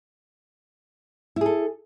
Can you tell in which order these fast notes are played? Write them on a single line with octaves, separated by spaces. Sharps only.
E4 G#4 A4